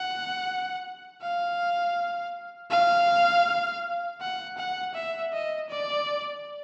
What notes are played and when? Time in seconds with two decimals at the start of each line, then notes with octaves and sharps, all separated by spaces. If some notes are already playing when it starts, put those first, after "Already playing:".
Already playing: F#5
1.22 F5
2.71 F5
4.21 F#5
4.57 F#5
4.95 E5
5.33 D#5
5.70 D5